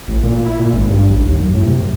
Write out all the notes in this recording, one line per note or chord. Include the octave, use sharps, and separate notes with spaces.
A1
A#2
E4
A#2
G#1
G2
A1
D#2
F#2
A2
C3
F#2